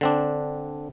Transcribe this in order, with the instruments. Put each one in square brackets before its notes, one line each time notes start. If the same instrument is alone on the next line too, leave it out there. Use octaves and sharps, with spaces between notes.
[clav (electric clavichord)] D3 C4 D4